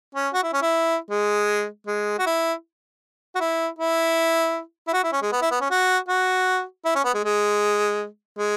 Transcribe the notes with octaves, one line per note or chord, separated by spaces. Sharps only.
C#4
F#4
E4
C#4
E4
G#3
G#3
F#4
E4
F#4
E4
E4
E4
F#4
E4
C#4
G#3
B3
E4
B3
C#4
F#4
F#4
E4
C#4
B3
G#3
G#3
G#3